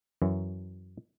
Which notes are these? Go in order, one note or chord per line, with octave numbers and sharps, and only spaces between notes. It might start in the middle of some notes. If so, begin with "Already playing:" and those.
F#2 E3 F#3